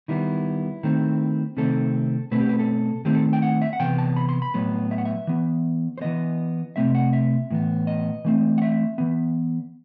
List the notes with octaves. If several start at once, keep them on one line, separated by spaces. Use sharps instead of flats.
D#3 G3 B3 E4
D#3 A3 C4
C3 D#3 A3 C4 A4
B2 A3 C4 B4
G4
B4
A4
D#3 A3 C4 G4
A4
G5
F#5
E5
F#5
C3 E3 B3 G5
A5
B5
C6
B5
A2 F#3 B3
E5
F#5
E5
E3 B3
C5
E3 B3 D#5
C3 E3 A3 C4 E5
F#5
E5
A2 E3 B3
D#5
E3 A3 C4
F#5
E5
E3 B3